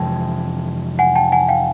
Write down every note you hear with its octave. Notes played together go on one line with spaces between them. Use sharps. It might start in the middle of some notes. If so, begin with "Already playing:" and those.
Already playing: F2 C3 E3 G#3 G5 A5
F#5 G#5
G5 A5
F#5 G#5
F5 G5